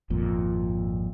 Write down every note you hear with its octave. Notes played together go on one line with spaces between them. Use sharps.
G#1 F2 A#2